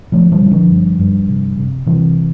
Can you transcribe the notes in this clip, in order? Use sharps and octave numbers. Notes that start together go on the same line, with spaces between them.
D3 F3 A3
E3 G3
D3
E3
D3 F3
G2
G2
C3
C3
C3 E3